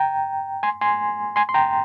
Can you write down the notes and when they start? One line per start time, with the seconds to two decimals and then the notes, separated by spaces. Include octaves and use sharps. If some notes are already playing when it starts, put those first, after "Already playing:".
Already playing: G5 A#5
0.63 G#5 C6
0.81 G#5 C6
1.36 G#5 C6
1.49 C6
1.54 G5 A#5